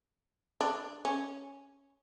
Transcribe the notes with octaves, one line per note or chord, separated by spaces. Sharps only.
D4
C#4